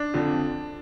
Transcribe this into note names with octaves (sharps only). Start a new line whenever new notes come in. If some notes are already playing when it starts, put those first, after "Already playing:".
Already playing: D4
F2 D3 F3